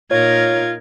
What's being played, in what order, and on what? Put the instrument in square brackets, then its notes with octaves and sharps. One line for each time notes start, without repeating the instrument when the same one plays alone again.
[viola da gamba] A#2 D#4 A#4 [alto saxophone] F4 [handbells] C#5 [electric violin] G#6